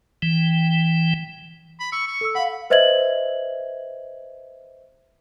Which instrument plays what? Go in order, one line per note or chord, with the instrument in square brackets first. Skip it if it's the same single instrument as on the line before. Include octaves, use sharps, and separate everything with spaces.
[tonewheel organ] E3 G5
[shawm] B5
[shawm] C#6 [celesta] E6
[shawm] C#6
[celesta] A4 E6
[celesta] F5 F#5 [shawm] B5
[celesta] B4 C5 D#5 E5 G#6 F#7